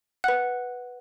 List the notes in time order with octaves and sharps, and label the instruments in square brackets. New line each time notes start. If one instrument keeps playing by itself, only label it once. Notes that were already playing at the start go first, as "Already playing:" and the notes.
[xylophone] B4 F#5 F#6